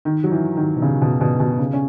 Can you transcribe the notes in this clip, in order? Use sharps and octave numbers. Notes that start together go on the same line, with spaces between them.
D#3
F#3
E3
D#3
B2
C#3
B2
B2
B2
C#3
C#4